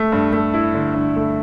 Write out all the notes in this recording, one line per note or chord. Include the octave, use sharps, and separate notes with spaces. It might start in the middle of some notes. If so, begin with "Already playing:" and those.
Already playing: A3
G2
A3
E4
D3
G2
A3